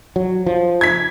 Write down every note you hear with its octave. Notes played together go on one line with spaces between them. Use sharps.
F#3
F3
G#6 B6